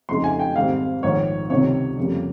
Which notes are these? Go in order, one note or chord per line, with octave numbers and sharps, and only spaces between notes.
F2 C#3 G#3 D#4 C6
G#5
G5
G#1 G#2 G3 C4 F5
A#1 G#2 D#3 C#5
C#2 C3 D#3 G3 C4 C#5
F2 C#3 G3 A#3